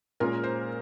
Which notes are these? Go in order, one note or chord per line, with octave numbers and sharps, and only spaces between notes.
A#2 G#3 C#4 F4 A#4
C5